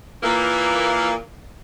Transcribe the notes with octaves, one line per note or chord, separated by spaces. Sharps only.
A#2 E3 A#3